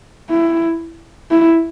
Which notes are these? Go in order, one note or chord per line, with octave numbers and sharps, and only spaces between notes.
E4
E4